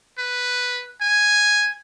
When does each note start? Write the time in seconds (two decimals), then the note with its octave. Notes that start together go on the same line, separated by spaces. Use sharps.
0.18 B4
1.01 G#5